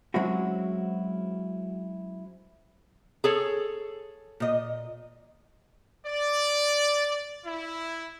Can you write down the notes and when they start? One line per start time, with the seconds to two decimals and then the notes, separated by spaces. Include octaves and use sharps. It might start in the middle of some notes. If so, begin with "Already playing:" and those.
0.14 F#3 G#3 C4 C#4 E4 F#4
3.24 G#4 A4 C#5
4.40 A#2 D#5
6.06 D5
7.45 E4